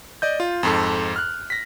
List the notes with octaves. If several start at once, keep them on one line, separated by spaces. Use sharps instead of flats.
D5 D#5 G6
F4
F2 G#2 A4
F6 F#6
A#6 B6